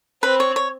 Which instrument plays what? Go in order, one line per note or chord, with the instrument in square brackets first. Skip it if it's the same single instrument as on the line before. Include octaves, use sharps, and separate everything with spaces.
[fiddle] C4 [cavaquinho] B4
[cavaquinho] C#5
C#5